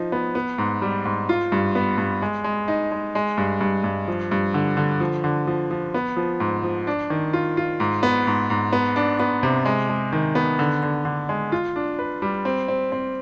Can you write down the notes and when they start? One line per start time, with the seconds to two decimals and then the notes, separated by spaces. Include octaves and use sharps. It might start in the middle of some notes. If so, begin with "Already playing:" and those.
Already playing: F3 D#4
0.12 B3
0.35 B3
0.58 G#2
0.82 G3
1.05 G#2
1.29 F4
1.52 G2
1.75 B3
1.98 G2
2.22 G#3
2.44 G#3
2.68 D#4
2.91 G#3
3.15 G#3
3.38 G2
3.61 G2
3.84 G2
4.08 F3
4.31 G2
4.54 D3
4.77 D3
5.00 F3
5.24 D3
5.47 F3
5.71 F3
5.94 B3
6.17 F3
6.40 G#2
6.63 F3
6.87 D4
7.10 D#3
7.33 F4
7.57 F4
7.80 G#2
8.03 B3
8.27 G#2
8.50 G#2
8.73 B3
8.96 D4
9.20 B3
9.43 C3
9.65 G#3
9.89 G#3
10.13 D#3
10.35 B3
10.59 D3
10.83 D3
11.05 D3
11.29 G#3
11.52 F4
11.76 D4
11.99 B4
12.22 G3
12.45 C4
12.68 C4
12.92 C4